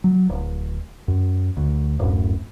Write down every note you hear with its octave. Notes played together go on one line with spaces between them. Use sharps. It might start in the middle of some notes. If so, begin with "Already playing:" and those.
F#3
D1
F#2
D2
D1 F#2 A2